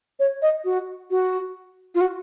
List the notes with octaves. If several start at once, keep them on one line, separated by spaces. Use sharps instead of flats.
C#5
D#5
F#4
F#4
F4
F#4